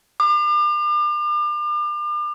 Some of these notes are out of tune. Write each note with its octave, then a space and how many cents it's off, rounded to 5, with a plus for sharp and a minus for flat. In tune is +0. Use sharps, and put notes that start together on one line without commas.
D6 +40